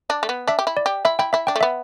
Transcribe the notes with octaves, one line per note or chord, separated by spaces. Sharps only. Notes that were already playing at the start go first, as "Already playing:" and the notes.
D4
A3
B3
D4 E5
G4
E4
D5
G4
E4 E5
E4 G5
E4 E5
D4 G5
A3
B3 E5